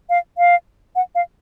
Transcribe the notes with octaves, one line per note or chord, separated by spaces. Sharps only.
F5
F5
F#5
F5